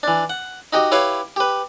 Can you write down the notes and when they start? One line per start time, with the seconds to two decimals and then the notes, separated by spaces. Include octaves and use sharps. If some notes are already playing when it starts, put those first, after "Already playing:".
0.03 E3 D4
0.30 F#5
0.73 D#4 F#4 G4 D#5
0.92 E4 G4 B4 C#5 F5
1.36 G4 B4